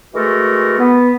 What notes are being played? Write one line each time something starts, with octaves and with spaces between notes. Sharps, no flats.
E3 G#3 A3 F#4 A4 A#4
B3